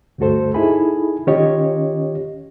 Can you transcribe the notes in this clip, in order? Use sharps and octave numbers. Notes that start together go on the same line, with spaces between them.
D2 G2 A3 F#4 A4 C5
D#4 E4 G#4 A4 G#5 B5
D#3 C#4 F4 G4 C#5 D#5